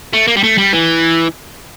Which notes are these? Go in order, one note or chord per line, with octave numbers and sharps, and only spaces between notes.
A3
A#3
G3
A3
G3
E3